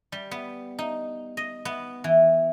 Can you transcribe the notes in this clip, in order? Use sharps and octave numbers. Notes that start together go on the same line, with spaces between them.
G3
B3
D#4
D#5
B3
E3